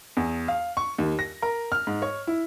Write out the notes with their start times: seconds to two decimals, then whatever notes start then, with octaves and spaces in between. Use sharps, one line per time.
0.17 E2
0.48 F5
0.77 C#6
0.98 D#2
1.19 A#6
1.42 A#4
1.72 F6
1.87 G#2
2.02 C#5
2.27 E4